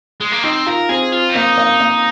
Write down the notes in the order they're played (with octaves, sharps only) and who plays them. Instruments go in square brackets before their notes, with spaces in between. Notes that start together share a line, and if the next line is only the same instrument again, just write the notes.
[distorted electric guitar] G#3
A#3
[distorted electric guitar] C4 [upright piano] D#4
[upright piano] F4 [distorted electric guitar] A#4
[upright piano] C4 [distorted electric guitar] G#4
[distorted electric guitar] F4
C4
[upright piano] A#3 [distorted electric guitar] D#4
[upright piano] A#3
A#3